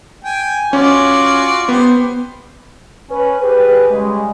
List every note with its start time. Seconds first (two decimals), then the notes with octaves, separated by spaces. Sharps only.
0.24 G5 G#5
0.73 C#4 F4 F#4 D5
1.68 B3 G4 C5
3.10 C#4 B4
3.41 G4 G#4 B4
3.89 C#3 G3 G#3